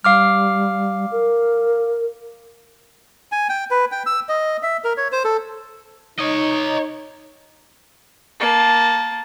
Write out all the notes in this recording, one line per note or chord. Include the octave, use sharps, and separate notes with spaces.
G3 F5 D6 F6
A#4
G#5
G5
B4
G5
E6
D#5
E5
A#4
C#5
C5
A4
D#4 C#5 D#5
A#3 A5